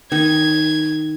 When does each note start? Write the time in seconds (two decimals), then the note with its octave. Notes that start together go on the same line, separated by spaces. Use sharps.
0.12 D#3 D#4 G#6